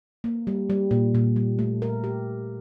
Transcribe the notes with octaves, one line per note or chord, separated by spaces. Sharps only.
A#3
G3
G3
A#2
A#2
G3
A3
A#4
G4